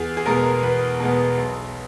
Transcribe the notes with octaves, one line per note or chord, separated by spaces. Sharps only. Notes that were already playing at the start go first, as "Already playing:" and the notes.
Already playing: E2 G#4
G#4
B2 G#3 B3 A#4
E2 B4
B2 G#3 B3
B1